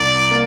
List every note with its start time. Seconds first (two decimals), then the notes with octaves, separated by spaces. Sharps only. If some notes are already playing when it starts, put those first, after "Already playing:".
Already playing: C2 D5
0.31 A#3